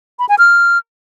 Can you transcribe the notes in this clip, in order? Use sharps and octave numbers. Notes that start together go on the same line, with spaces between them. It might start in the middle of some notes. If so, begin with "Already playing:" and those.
B5
G#5
F6